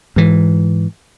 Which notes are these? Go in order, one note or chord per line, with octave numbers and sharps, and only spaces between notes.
G#2 E3